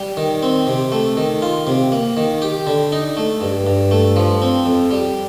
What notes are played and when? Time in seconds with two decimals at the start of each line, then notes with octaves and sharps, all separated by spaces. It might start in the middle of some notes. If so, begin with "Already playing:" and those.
Already playing: G3
0.17 D#3
0.42 C4
0.67 C3
0.92 A3
1.17 D#3
1.42 F4
1.67 C3
1.92 A#3
2.17 D#3
2.42 G4
2.67 D3
2.92 D#4
3.17 A3
3.41 G2
3.67 G2
3.91 A3
4.16 F3
4.42 C4
4.66 F2
4.91 G3